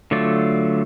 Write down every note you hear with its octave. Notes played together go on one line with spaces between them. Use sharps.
D3 F#3 A3 F4 D5